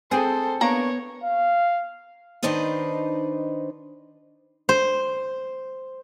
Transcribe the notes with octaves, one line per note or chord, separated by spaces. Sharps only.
C4 G#4 A4 C5
A#3 B3 D4 C#5 A#5
F5
D#3 D4 D#4 B4 C5 D#5
C5